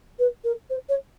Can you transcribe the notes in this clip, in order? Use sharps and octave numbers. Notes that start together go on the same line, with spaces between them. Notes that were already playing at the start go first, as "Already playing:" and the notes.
B4
A#4
C5
C#5